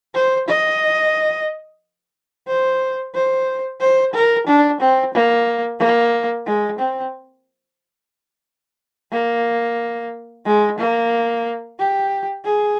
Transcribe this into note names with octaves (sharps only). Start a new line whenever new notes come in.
C5
D#5
C5
C5
C5
A#4
D4
C4
A#3
A#3
G#3
C4
A#3
G#3
A#3
G4
G#4